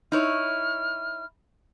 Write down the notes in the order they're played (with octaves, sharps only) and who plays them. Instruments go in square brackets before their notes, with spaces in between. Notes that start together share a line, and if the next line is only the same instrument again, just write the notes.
[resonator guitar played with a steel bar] D#4 E4 C#5 [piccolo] F6